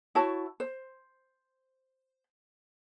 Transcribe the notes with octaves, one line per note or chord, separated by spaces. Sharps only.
E4 F#4 C#5 A5
C5